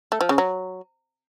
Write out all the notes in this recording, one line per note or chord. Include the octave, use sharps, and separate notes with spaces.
A3
F3
C#3
F#3